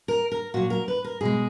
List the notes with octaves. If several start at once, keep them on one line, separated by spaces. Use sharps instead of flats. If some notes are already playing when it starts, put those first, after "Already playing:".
A#4
A#4
A#2 F#3 F#4
A#4
B4
A#4
B2 G#3 G#4